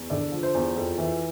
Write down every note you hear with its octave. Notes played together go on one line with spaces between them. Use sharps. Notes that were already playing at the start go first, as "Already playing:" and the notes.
Already playing: E2
D3 D5
F3
C5
E2
F2
E3